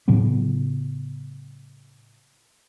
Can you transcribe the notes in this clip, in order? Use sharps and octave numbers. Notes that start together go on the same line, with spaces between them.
A2 C#3 F#3 B3